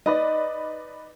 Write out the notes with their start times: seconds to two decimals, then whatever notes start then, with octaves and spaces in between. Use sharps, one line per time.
0.06 D#4 B4 D5 D#5